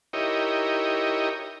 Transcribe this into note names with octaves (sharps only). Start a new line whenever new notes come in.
D#4 E4 G4 A#4 C#5 D#5